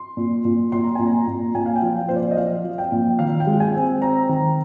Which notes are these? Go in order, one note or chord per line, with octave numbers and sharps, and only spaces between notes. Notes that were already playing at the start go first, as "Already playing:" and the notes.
Already playing: C6
A#2
A#2
A#2 C6
A#5
A#2 G#5
A#5
A#2
A#2 G#5
F5
G5
F3
F5
A#2 C5
D5
D#5
F3 F5
F3
G5
A#2
D#3 F5
G5
G#3
G#5
C4
C4 A#5
D#3